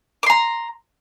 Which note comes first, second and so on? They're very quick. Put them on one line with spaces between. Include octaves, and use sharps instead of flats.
D6 C6 A#5